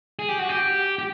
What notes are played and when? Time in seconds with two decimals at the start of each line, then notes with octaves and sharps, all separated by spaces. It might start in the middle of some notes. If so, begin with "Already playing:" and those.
0.19 G#4
0.29 G4
0.39 F#4
0.49 G4
0.99 G4